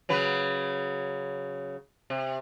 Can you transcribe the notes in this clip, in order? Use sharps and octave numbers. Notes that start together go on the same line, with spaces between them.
C#3 F#3 B4
C3